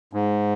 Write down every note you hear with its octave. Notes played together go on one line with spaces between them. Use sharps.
G#2